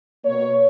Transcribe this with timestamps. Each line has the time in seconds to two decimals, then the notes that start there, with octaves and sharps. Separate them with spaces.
0.25 B2 A#3 C#5